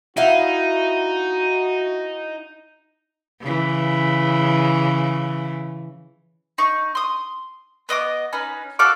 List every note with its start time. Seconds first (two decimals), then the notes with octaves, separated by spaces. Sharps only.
0.17 D#4 E4 F#4 F5 F#5
3.42 C#3 E3
6.58 D#4 C#6
6.95 C6 D#6
7.89 B3 D#5 F5 D6
8.33 C#4 D#4 B4
8.79 F#4 A4 F5 D6